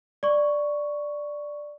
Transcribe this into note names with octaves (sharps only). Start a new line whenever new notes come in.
D5 C#6